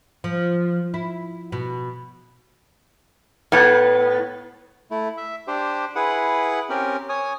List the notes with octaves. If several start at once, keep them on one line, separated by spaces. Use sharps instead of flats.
F3
E4
B2
A2 B3
A3 E4
E5
D4 G4 C5
E4 G#4 B4 F#5
C4 C#4 G4 A#4
C#5 G#5 D#6